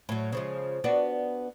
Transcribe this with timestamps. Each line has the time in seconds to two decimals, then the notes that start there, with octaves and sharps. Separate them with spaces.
0.09 A2 F#3
0.32 C#3 F3 G#3
0.84 B3 D4 F#4